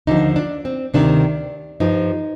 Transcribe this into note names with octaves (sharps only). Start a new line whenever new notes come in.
D#2 D3 F3 D#4
D4
C4
D2 C3 D#3 D4
G2 F3 D#4